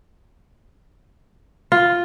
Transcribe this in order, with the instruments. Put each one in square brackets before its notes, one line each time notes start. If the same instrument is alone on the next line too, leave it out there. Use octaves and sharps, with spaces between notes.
[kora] F4